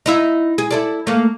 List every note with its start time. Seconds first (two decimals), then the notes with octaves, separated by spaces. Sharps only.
0.06 D#4 E4 E5
0.58 G#4
0.71 E4 A4 D5
1.07 A3 A#3